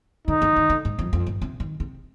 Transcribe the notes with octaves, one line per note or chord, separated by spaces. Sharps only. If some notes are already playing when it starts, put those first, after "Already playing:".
D3 D#4
D#3
D#3
D3
G#2
F2
F2
G2
C3
D#3
C3